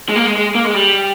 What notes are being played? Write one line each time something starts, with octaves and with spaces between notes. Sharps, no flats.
G#3
A#3
G#3
G#3
A#3
G#3
G3